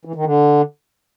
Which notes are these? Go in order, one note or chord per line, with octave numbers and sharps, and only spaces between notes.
E3
D#3
D3